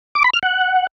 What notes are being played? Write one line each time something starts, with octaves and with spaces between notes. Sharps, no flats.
D6
B5
F6
F#5